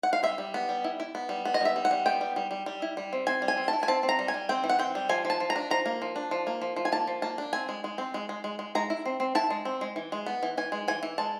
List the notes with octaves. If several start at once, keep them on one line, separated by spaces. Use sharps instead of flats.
F#5
F5
G3 E5
G3
B3
G3
E4
E4
B3
G3
B3
D#5
G3 E5
G3
F#5
G3
B3 G5
G3
G3
G3
G3
E4
G3
C4
C4 G#5
G3
G#5
C4
A5
E4
G#5
C4 A5
C4
A#5
G3
G#5
G3
C4 G5
E3
F#5
C4 G5
G3
F3 G#5
F3
A5
F3
A#5
D4
F3 A#5
A#3
F3
D4
F3
A#3
F3
F3
G#5
A#3 A5
F3
A#3 A5
D4
C4 G#5
G#3
G#3
C4
G#3
G#3
G#3
G#3
G#3 A#5
E4
C4
C4
E4 A5
G#3
C4
G#3
E3
G#3
B3
E3
E3 G#5
G#3
E3 G#5
E3
G#3 A5